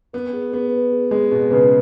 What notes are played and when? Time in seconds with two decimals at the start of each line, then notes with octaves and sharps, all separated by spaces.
0.13 B3 B4
0.33 G#4
0.53 B3 G#4
0.73 B4
0.92 G#4
1.11 G#3 G#4
1.31 B2 G#4
1.51 C#3 B4